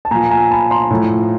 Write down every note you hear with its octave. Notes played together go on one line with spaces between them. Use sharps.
A5
A#2 F3 G#5 A#5
G#5 A#5
A5 B5
A#5 C6
A2 F3